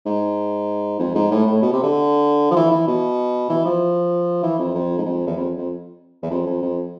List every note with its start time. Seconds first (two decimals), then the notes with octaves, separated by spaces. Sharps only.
0.06 G#2
0.99 F2
1.15 G#2
1.31 A2
1.47 A2
1.62 B2
1.73 C3
1.83 D3
2.51 F3
2.56 E3
2.71 E3
2.87 B2
3.50 E3
3.65 F3
4.43 E3
4.59 F2
4.75 F2
4.98 G#2
5.05 F2
5.27 E2
5.37 F2
5.58 F2
6.23 E2
6.31 F2
6.46 F2
6.62 F2